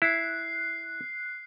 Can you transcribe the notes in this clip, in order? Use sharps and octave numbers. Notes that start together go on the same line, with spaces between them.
E4 F#6 C7